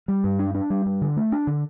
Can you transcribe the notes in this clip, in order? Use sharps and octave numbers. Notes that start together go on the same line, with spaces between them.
G3
G2
D4
D4
G3
G2
D3
A3
D4
D3